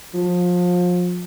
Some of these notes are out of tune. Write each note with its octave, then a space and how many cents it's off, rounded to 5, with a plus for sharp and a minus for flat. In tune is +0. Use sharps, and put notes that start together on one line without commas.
F3 +30